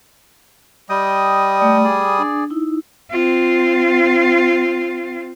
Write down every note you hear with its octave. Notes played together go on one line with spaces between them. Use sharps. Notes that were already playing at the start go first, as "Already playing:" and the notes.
G3 D#5 G5 D#6
A3 D5
G#4 D5 G#5
D4
D#4 E4
C4 F4